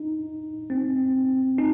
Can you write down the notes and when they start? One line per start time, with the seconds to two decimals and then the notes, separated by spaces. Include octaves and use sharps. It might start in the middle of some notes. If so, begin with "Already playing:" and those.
Already playing: D#4
0.70 C4
1.58 D#4